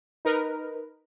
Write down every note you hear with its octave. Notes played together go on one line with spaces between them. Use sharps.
D#4 A#4 B4